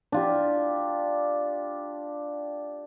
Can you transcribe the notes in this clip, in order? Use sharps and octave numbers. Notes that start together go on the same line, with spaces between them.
D4 F4 G4